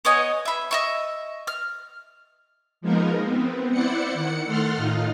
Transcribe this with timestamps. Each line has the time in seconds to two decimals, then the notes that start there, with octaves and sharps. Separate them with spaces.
0.05 B3 C#5 D#5 G#5
0.45 E5 B5
0.71 D#5 E5 C#6
1.47 F6
2.81 F3 G#3 A#3 B3 D#4 A#4
3.25 B3 C4
3.71 E4 C5 D5 F#5 C#7
4.14 D#3 F#5 C#7
4.45 D#3 A3 A4 F#5 C6 F6
4.76 A2 D#4 F4